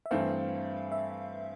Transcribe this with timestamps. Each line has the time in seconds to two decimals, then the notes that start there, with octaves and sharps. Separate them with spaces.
0.06 E5
0.11 G2 E3 A3 C4 F5
0.92 E5